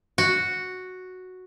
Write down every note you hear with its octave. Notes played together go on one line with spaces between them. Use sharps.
F#4